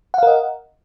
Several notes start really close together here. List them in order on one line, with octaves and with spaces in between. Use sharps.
F#5 F5 A#4 D#5